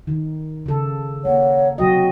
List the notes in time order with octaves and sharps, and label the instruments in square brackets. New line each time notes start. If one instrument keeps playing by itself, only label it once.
[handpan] D#3
C#3 A4
[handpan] A#3 [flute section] C#5 F#5
[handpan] C3 F#3 D#5 [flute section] F#4 G5